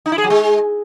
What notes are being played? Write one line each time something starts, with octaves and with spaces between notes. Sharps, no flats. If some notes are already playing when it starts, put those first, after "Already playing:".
D#4
E4
G#4
F#3
G#3